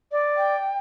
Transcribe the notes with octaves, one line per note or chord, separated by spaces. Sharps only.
D5
G5